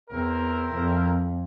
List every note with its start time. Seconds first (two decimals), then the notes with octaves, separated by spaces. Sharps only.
0.10 E2 C4 E4 A#4
0.74 F2